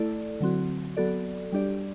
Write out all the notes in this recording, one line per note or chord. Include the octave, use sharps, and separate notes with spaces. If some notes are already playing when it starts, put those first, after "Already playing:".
Already playing: A3 E4 A4 D5
D3 F#3 C4 F#4
F#3 B3 F#4 A4 D5
G3 D4 G4 D5